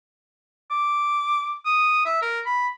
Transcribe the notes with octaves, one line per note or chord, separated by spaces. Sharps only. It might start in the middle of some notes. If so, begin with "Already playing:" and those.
D6
D#6
E5
A#4
B5